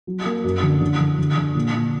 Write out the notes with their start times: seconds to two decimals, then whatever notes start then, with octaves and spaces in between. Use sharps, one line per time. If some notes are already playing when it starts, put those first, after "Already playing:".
0.07 F#3
0.25 A#3
0.44 F#2
0.63 D3
0.81 D3
1.00 D3
1.18 D3
1.37 D3
1.55 A#2
1.73 A#2